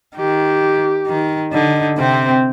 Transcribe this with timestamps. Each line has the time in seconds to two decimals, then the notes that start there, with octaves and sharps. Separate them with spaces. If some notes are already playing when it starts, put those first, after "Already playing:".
0.16 D#3 G4
1.07 D#3
1.52 D3 D#4
1.98 C3 C4